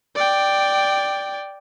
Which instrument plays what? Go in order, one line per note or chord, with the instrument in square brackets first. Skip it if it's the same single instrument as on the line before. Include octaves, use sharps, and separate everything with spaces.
[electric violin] D5 G5